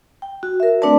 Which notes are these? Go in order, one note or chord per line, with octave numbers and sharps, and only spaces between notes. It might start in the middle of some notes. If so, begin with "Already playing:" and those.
G5
F#4
A#4 E5
A3 C4 D4 B4 D5 A5